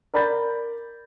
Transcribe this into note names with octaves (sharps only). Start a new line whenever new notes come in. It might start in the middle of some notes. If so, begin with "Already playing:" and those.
A#4 D5 B5 G6 A6